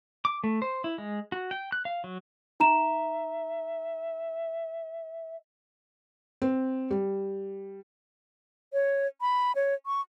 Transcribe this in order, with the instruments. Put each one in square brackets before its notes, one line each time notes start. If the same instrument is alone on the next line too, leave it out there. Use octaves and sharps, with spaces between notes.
[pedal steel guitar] D6
A3
C5
E4
G#3
F#4
G5
F#6
F5
F#3
[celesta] D#4 A#5 E7 [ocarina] E5
[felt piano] C4
G3
[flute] C#5
B5
C#5
C#6